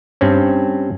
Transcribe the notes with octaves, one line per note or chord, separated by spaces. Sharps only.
G2 C4 C#4